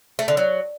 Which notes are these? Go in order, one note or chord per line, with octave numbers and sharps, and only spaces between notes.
A3
D3
F#3